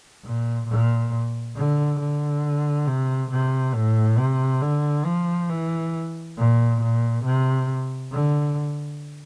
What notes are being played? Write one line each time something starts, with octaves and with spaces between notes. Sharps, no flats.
A#2
A#2
D3
D3
C3
C3
A2
C3
D3
F3
E3
A#2
A#2
C3
D3